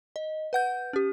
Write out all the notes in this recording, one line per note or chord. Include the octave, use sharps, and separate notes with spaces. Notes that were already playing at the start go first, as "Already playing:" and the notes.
D#5
B4 F#5 G6
C#4 G4